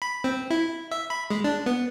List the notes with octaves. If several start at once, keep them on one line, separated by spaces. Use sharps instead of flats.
B5
C4
E4
E5
B5
G#3
D4
B3